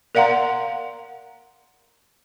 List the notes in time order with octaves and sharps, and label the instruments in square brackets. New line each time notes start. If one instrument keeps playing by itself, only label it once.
[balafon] A#4 D5 F5 F#5 A#5 C6